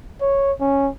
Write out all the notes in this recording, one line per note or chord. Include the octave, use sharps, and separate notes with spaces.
C#5
C#4